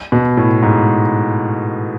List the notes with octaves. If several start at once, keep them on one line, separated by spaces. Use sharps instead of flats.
B2
A2
G#2